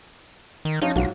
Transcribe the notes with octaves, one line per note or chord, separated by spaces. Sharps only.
D#3
F3 C#4 D#4 F4
B1 G#2 F#3 F4